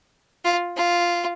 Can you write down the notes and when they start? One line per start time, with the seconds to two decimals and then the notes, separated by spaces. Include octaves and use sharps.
0.45 F4
0.77 F4